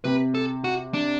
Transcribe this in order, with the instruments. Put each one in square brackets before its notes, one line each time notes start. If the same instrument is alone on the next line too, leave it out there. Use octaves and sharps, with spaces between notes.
[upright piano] C3 [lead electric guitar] B4
[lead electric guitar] A4
F#4
D4